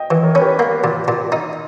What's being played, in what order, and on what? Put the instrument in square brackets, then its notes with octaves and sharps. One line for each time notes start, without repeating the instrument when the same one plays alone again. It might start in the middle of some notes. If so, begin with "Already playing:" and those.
Already playing: [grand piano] D#5 G5
[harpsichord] E3
[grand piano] A#4 C#5
[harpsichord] C#4 [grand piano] B4
[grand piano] G4 A#4
[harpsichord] A#3
A#2
A#2
D#4